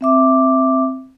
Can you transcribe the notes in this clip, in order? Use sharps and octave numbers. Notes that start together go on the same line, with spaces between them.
C4 E5 D6